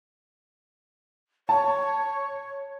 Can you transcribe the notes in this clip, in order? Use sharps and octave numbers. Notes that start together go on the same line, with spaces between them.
C#5 A5